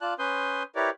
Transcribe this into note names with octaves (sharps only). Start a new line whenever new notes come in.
F4 D5 A5 F#6
C#4 B4 C6 D#6 G6
E4 G4 A#4 B4 C#5 D5